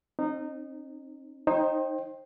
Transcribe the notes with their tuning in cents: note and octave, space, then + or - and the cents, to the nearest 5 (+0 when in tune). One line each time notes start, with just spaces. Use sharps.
C4 +35 D#4 -20
D#4 +0 C5 +30 G5 +0